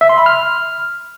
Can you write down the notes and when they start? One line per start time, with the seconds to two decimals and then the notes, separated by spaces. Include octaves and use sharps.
0.01 E5
0.09 C6
0.18 B5
0.26 F6